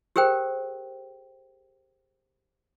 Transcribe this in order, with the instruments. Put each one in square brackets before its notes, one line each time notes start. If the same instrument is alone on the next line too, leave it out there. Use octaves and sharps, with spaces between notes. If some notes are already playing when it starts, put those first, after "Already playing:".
[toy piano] G4 G#4 A#4 C5 G5